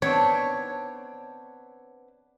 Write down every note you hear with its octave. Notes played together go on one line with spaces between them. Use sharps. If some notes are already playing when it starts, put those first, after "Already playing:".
B3 C4 D4 C#5